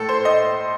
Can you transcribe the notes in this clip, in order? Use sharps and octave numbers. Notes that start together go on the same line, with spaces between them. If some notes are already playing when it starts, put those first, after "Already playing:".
Already playing: A2 A3 A4
C5
D#5